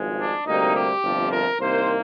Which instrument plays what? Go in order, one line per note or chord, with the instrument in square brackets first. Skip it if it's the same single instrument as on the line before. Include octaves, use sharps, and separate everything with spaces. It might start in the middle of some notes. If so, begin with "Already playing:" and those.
Already playing: [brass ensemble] G#1 G2 F3 G#3
D4
D2 C3 G3 A#3 D#4
G4
G1 F2 C3 F3
A#4
C2 C3 D#3 A#3 C5